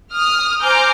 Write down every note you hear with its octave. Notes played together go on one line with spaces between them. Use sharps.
D#6 F6
C5 G#5 A#5 D6 F6 G6